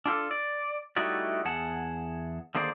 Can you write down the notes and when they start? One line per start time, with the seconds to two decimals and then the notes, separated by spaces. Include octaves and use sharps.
0.06 D4 F4 G4 A4
0.31 D5
0.96 G3 A3 D#4 E4 F#4 D5
1.45 E2 G#4 F#5 A5
2.55 D3 D#3 A#3 G#4 C5 D5